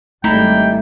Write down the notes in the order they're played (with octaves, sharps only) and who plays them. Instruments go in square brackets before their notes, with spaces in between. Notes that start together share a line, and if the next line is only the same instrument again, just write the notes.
[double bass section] G#1 G#2 G3 [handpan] A3 [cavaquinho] D#4 E4 [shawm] G5